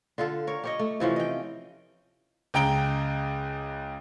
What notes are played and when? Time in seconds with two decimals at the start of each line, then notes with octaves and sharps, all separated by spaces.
0.18 D3 F4 A4
0.47 A#4 C#5
0.64 G4 C#5 D#5
0.79 A3
1.00 C3 E3 F3 C#4
1.16 D#5 G5
2.54 C#2 C#3 G5 A#5 D7 G7